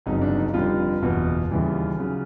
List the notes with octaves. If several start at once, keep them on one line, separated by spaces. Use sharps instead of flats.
G1 F2 C#3 F#3 D#4
D4
D#4
F1 F2 D3 G3 F4
F#1 E2 B2
D#2 C#3 E3 G3
C#3 F#3